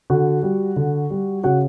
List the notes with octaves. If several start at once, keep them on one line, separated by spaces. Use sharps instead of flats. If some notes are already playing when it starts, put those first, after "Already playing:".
D3 F#4 F#5
G3
D3
G3
C#3 F#4 F#5